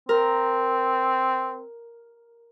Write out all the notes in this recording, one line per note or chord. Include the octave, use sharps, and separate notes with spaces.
C4 A#4